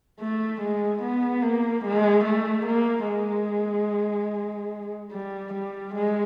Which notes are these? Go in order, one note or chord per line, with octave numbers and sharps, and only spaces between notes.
A3
G#3
B3
A#3
G#3
A3
A#3
G#3
G3
G3
G#3